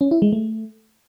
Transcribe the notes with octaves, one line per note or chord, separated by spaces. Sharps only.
C#4
E4
G#3
A3